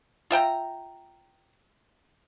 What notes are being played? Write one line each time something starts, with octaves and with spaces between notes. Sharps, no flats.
F4 E5 G5 A#5